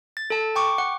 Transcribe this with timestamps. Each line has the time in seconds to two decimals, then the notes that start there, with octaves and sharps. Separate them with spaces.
0.17 A6
0.30 A4 A5
0.56 G5 C#6 D6
0.78 F#5